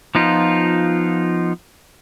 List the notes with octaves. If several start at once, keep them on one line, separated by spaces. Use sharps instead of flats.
F3 B3 D#4 F4